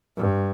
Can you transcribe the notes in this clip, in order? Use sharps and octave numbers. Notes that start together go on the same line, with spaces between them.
G2